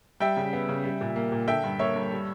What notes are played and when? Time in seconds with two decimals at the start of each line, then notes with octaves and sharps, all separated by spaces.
0.20 G3 E5 G5
0.37 C#3
0.53 B3
0.69 C#3
0.84 G3
1.01 A#2
1.16 A#3
1.32 A#2
1.47 D3 E5 G5
1.63 G2
1.79 A#3 C#5 E5
1.96 G2
2.11 G3